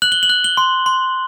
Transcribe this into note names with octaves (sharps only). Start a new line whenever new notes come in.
F#6 F#7
G7
F#7
F#6
G7
C6
C6